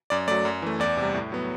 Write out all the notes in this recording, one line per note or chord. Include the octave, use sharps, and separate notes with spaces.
F#2 D5
F#3 A3 D5
F#2
E3 A3
E2 D5
C3
G3
A2
F#3 B3